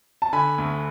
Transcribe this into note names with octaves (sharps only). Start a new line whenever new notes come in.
A5
D3 G#5 B5
D2